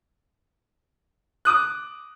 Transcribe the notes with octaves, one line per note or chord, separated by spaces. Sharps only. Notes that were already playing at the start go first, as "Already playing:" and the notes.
D6 D#6 F#6